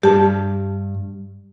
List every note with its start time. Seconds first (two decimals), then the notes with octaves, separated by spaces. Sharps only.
0.03 G2 G4 A5